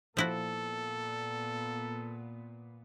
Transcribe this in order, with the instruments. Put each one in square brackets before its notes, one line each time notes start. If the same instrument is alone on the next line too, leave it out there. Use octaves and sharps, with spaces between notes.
[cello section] A#2 B3 [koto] F3 E4 F#4 [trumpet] A4